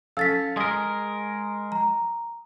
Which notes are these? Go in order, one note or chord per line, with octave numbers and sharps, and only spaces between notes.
C#4 A4 F5 E6 A6 B6
G#3 A#4 D#6
A#5